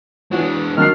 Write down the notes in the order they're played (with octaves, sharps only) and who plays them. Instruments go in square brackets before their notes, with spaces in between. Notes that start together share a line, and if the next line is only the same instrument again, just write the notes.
[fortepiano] E3 F#4 C#5 [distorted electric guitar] G#3 D4
[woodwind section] D#3 D4 F6 [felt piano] F#3 C7